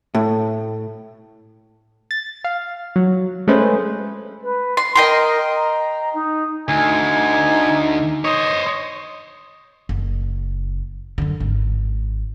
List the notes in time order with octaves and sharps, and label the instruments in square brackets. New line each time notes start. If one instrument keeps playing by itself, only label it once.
[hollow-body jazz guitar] A2
[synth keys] A6
F5
F#3
G#3 A3 C#4 B4 C5
[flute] B4
[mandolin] C6
[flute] A#4 [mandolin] D#5 G5 C6
[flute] A#5
D#4
[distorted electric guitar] D2 [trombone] D#4 [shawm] G#5
[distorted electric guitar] C5 C#5 [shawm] D#5
[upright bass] F#1
F#2 D3
G#1